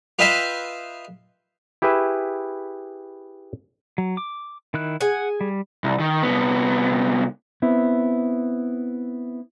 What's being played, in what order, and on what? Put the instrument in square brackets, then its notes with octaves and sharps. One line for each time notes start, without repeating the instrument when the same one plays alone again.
[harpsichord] F4 B4 D#5 E5 G5 C6
[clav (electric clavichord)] E4 G4 G#4 B4 E5
[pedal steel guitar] F#3
D6
D#3 E4 F#6
[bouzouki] G#4 G#5 [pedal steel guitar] F#5
[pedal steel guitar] G3
[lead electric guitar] C2
D#3
C2 B3
[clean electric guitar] B3 C4 E4